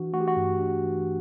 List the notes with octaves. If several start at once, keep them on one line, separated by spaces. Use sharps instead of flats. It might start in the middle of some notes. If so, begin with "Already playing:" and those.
Already playing: E3 D4 F#4
A3 F#4
G4
F#4
G2
D4
E3